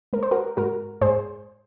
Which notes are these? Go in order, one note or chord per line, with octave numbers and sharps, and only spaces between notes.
G#3 A#4
C5
F#4 A#4
G#2 F#4 A#4
G#2 G#4 C5